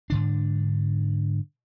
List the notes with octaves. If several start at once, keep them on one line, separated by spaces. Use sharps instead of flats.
G#2 D3 D4